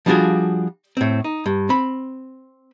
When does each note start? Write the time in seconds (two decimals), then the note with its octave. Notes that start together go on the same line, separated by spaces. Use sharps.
0.06 F3 G3 D4 F4 F#4 G#4
0.97 A2 C4
1.24 D#4
1.46 G2
1.69 C4 B5